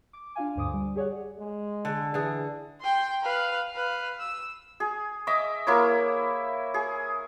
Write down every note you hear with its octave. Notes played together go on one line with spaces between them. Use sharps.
D6
D4 F4 F5 G#5
D2 G2 D3 C5 D6 D#6
G3
G4 G#4 C#5 D5 F#5
G#3
D3 A5
D3 E3 G#4
G5 C6
B4 F5
B4 F5
E6
G#4
D#5 E5 D6
A#3 E4 C#5
G#4